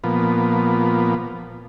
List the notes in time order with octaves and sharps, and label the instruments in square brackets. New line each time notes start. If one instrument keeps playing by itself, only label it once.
[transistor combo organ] A#2 F3 B3